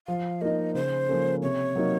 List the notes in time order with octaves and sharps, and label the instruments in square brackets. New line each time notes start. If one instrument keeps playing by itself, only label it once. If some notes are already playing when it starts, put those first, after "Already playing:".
[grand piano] F3 [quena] F5
[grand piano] A#3 D#4 [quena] D#5
[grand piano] C#3 [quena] C5
[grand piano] F3 A#3 C#4 A4
[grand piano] C3 [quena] C#5
[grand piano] F#3 A#3 D#4